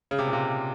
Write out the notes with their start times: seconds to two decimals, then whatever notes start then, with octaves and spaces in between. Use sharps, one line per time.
0.11 C#3
0.19 C3
0.27 A#2
0.33 C3